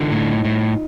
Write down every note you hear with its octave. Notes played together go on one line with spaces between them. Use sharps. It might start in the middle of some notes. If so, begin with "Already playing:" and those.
Already playing: D3 D#4 F4
A2
A2